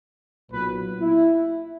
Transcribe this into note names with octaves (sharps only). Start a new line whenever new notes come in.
B1 A#2 F#3 B3 B4
E4